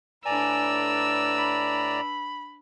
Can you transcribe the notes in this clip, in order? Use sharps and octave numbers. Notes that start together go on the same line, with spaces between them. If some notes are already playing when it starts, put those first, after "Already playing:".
A2 D4 B4 D5 G#5 A#5 E6
A4
B5